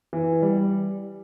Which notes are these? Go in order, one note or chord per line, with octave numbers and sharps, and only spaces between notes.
E3
G3